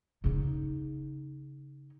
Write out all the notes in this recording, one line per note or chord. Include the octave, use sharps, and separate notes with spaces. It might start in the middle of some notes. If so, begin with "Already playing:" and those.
C#3 D#4